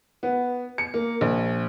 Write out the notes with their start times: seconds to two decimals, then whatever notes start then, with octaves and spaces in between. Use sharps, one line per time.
0.23 B3
0.78 C#7
0.94 A#3
1.21 A#1